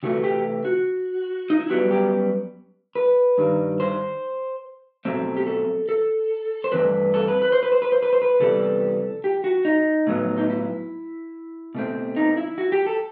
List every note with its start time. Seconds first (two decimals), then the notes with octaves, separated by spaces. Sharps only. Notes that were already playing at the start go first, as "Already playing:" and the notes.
0.03 C3 E3 A3 F#4
0.24 G4
0.65 F#4
1.50 D#4
1.60 E4
1.70 F#2 D#3 G3 B3 F#4
1.91 G4
2.95 B4
3.38 G2 D#3 G3
3.80 C5
5.05 B2 F#3 A3 C4
5.37 G4
5.47 A4
5.89 A4
6.64 C5
6.72 G2 E3 A3 C4 B4
7.14 A4
7.28 B4
7.42 B4
7.52 C5
7.63 B4
7.72 C5
7.82 B4
7.92 C5
8.03 B4
8.13 C5
8.22 B4
8.40 C3 E3 G3 B3 A4
9.24 G4
9.44 F#4
9.65 D#4
10.07 A2 F#3 B3
10.38 D#4
10.50 E4
11.75 B2 A3 C4
12.16 D#4
12.37 E4
12.58 F#4
12.72 G4
12.86 A4